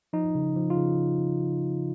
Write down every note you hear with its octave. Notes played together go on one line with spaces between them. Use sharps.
F3 D#4
C#3
F3
F4
C#3